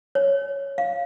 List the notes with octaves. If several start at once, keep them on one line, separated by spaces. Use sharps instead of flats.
C#5
F5